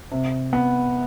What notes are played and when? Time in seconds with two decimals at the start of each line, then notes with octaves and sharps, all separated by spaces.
0.12 C3
0.53 B3